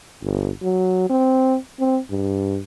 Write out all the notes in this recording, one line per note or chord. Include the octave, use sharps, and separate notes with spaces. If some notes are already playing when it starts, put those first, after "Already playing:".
G1
F#3
C4
C4
G2